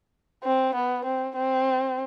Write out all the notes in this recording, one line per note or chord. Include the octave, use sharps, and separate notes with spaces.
C4
B3
C4
C4